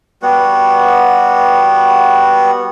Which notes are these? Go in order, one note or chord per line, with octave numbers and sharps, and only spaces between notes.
G3 B3 F#4 F#5